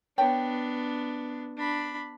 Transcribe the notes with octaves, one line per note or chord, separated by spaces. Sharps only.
B3 D4 C#5 G5 A5
D4 B5